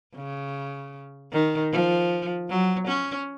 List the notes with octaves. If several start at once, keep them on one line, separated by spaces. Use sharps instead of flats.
C#3
D#3
F3
F#3
C#4